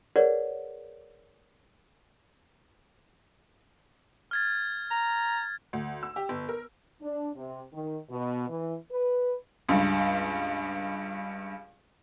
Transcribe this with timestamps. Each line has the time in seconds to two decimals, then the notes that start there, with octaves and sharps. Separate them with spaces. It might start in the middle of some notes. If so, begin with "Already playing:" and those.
0.16 G#4 A#4 B4 C#5 D5 F#5
4.31 F6 G#6 A6
4.91 A#5
5.73 D2
6.03 E6
6.16 G4
6.29 G1
6.49 A#4
7.01 D4
7.35 C3
7.73 D#3
8.10 B2
8.49 E3
8.91 B4
9.69 C#2 G2